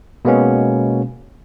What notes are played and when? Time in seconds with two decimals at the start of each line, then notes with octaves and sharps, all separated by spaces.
0.25 B2 G#3 A#3 B3 C#4